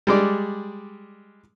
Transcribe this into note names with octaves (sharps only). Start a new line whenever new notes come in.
G3 G#3 D5